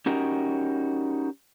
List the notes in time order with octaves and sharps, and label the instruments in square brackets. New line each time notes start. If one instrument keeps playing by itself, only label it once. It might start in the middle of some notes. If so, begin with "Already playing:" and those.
[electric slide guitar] C#4 D#4 F#4 G4 A#4